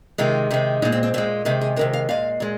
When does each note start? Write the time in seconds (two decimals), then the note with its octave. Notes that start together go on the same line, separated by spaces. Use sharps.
0.18 C3 D#3 G#3 F4
0.51 C3 D#3 G#3
0.82 A#2 G#3 D#4
0.92 C4
1.03 C4
1.14 A#2 G#3 C4
1.45 C3 D#3 G#3 D#4
1.61 G#4
1.76 C3 D#3 G#3 A#4
1.93 F5
2.09 A#2 G#3 F5
2.40 A#2 G#3